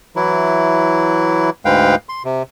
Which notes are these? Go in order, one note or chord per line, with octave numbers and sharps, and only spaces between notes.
E3 F#3 E4
D2 G#2 G#3 B4 F5 G5
C6
C3